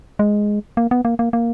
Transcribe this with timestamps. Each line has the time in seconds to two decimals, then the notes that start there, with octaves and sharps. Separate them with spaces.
0.19 G#3
0.77 A#3
0.91 B3
1.05 A#3
1.19 A#3
1.33 A#3